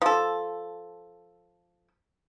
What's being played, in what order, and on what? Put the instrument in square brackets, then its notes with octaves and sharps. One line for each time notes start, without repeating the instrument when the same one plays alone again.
[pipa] F3 A4